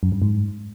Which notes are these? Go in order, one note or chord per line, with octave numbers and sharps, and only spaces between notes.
F#2
G2
G#2